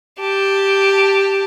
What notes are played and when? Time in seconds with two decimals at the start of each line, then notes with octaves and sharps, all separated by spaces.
0.20 G4 A5